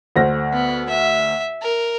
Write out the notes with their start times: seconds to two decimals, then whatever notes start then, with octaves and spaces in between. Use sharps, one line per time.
0.16 D2 C5 A#6
0.53 B3
0.89 E5
1.62 A#4